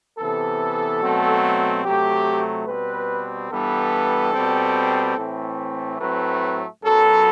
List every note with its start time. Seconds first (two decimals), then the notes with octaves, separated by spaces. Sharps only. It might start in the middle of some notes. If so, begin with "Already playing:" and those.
0.18 C3 E3 B3 A4
1.01 B2 F#3 A3 C4
1.84 C3 F#3 A3 G4
2.67 B2 G3 C4 B4
3.51 G2 E3 G3 B3 A4
4.34 B2 G3 C4
5.18 A2 E3 A3 C4
6.00 A2 F#3 A3 C4 B4
6.83 F#2 F#3 B3 A4